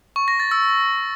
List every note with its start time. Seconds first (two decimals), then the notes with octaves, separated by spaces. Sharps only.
0.16 C#6
0.28 A#6
0.40 A6
0.51 E6